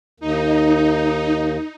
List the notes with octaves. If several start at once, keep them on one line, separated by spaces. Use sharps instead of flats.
D#2 D#4